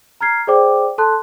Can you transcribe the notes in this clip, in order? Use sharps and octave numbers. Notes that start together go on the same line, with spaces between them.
A#5 F6 G#6 C7
G#4 C5 D5 G5 D6
A4 A5 C6 F#6